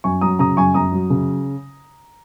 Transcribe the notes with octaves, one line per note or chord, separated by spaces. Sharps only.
F#2 G#5 C#6
F#3 A#5 D#6
C#3 A#5 D#6
F#2 G#5 C#6
F#2 A#5 D#6
F#3
C#3